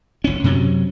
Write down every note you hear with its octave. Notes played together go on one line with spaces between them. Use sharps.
F#1 C#4
F#2 C3 F#3 C#4